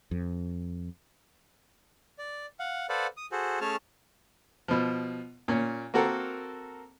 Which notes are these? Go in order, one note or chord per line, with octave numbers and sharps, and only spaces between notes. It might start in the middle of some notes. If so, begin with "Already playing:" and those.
F2
D5
F5 F#5
A4 B4 C5 D5 F5 F#5
D#6
F#4 G#4 A4 C5
A3 C#4 G#4 C#5 A5 F6
B2 F3
A#2 C#4
A#3 C4 F#4 A4 A#4